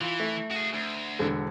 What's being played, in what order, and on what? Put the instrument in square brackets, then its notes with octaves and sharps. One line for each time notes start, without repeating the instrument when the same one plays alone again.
[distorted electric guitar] E3 [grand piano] F4
[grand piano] A3
[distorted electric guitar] F#4 G#4
D2
[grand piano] E1 D3 A4